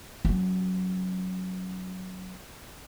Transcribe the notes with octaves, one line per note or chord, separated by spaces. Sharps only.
F#3 C#4